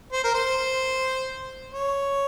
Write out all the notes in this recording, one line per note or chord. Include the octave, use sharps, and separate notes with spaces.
C5
A#4
C5
C#5